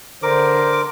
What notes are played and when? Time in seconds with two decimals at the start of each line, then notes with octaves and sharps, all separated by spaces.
0.23 D3 A#4 C5 D6